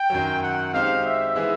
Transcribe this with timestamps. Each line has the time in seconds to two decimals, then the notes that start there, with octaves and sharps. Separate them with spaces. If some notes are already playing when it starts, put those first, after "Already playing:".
Already playing: G5
0.10 F#2 D#3 F#3
0.41 F#5
0.73 G#3 C4 D#4 G4 C5 F5
1.04 E5
1.35 E3 G#3 B3 E4 G#4